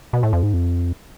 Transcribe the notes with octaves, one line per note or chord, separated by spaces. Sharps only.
B2
A2
F2
G#2
F2